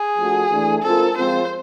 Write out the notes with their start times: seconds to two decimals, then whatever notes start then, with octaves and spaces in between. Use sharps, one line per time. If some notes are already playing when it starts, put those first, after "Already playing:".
Already playing: G#4
0.17 F3 A3 D4 F#4
0.51 E3 A3 D4
0.83 G#3 C4 F4 A4 A#4
1.17 F3 G#3 C4 F4 C5